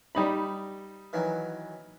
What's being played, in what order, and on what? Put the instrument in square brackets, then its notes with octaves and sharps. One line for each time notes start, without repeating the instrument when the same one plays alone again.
[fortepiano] G3 D#4 B5
[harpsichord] D#3 E3 F#3